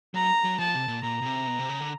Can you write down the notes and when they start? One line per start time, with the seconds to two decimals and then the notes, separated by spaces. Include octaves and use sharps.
0.14 F#3 A#5
0.44 F#3
0.59 F3 A5
0.74 C3
0.88 A#2
1.03 A#2 A#5
1.21 B2
1.26 C3
1.47 B2
1.59 C3
1.69 C#3
1.81 D3